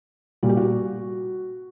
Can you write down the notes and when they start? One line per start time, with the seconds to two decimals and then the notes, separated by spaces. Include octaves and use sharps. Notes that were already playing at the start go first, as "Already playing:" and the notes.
0.43 A#2 G3 F#4
0.49 G4
0.57 F#4